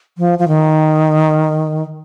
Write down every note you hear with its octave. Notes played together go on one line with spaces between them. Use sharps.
F3
F3
D#3